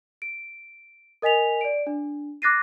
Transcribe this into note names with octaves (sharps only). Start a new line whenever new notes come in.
D7
A#4 D#5 G#5 B6 F7
D5 D7
D4
D6 F#6 A6 A#6 C7 D#7